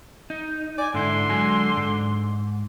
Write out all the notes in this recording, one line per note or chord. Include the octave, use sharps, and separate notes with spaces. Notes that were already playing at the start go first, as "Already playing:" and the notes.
D#4
D5 G#5
G#2 D3 E4 C6
F#3 G#3 G#5
G#2